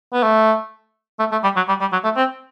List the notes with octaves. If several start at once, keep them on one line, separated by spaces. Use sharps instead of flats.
B3
A3
A3
A3
G3
F#3
G3
G3
F#3
A3
C4